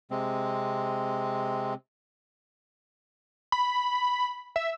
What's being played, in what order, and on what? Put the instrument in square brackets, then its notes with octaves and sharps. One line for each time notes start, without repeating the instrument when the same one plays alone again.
[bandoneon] C3 G#3 C4
[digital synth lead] B5
E5